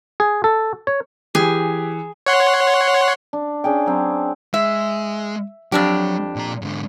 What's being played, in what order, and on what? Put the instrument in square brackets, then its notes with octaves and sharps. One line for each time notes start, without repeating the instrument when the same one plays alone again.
[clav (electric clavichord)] G#4
A4
C#5
[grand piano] E3 [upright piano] G4 [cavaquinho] G#4
[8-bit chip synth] C#5 F#5 C6
[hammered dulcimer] D4
C#4 D4 G#4 G5
F#3 C4
[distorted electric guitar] G#3 [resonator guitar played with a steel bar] E5
[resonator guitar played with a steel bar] F2 D4 G4 [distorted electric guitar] F#3
[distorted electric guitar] A#2 A#5
G#2 D3